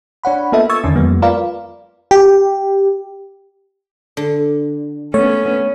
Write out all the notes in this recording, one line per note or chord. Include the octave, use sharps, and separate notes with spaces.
D4 C#5 F#5 B5
A#3 B3 F4 A4 D#5 E5
C#6 D#6 E6 G#6 A6
E2 D3 D#3 C#4 D4
F2 F#3 G#3 A#3 B3
F4 A#4 B4 D5 F5
G4
D3
A3 B3 C#4 C#5